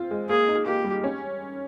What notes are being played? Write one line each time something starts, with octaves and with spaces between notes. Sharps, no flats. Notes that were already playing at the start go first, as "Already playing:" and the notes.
Already playing: C4 F4
G#3
A#3 G#4
D#4
A#3 G4
G3
C#4